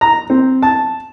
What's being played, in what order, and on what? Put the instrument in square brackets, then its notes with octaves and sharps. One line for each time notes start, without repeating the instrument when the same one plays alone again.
[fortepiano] A#5
C4
A5